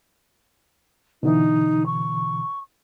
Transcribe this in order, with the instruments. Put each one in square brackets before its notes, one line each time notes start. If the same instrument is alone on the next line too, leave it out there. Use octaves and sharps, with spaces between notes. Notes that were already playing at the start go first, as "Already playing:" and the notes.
[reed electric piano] B2 D3 E3 [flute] D#4
[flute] C#6